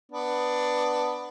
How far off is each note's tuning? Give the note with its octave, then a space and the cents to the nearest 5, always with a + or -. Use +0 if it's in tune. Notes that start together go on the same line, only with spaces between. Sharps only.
B3 +5 D4 +10